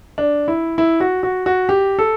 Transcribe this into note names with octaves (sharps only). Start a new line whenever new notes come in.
D4
E4
E4
F#4
F#4
F#4
G4
A4